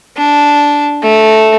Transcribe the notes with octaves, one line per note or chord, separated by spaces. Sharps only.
D4
A3